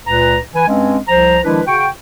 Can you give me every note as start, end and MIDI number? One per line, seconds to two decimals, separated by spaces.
0.06 0.38 37
0.06 0.38 46
0.06 0.38 71
0.06 0.38 82
0.55 0.64 52
0.55 0.64 71
0.55 0.64 80
0.68 0.98 43
0.68 0.98 56
0.68 0.98 60
0.68 0.98 61
1.08 1.39 36
1.08 1.39 53
1.08 1.39 72
1.08 1.39 82
1.44 1.60 51
1.44 1.60 53
1.44 1.60 56
1.44 1.60 62
1.44 1.60 64
1.44 1.60 71
1.67 1.87 49
1.67 1.87 66
1.67 1.87 79
1.67 1.87 85